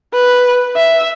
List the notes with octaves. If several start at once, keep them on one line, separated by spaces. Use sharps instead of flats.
B4
E5